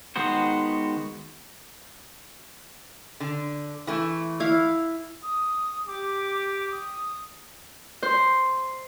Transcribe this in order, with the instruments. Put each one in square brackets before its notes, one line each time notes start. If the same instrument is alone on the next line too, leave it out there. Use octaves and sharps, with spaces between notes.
[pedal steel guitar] D#3 G#3 B3 F#4 C5
[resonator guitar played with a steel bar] D3
E3 A3
[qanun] E4 F5
[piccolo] D#6
[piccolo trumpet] G4 [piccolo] D6
[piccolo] D#6
[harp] C5